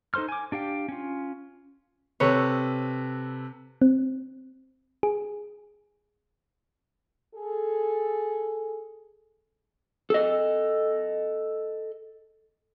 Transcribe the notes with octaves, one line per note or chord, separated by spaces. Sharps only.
D#4 A4 C5 C6 F6
G#5 D6
D4 G4 F5 G5
C#4 F4
C3 A4 B4 C#5
C4
G#4
G#4 A4
A4 D#5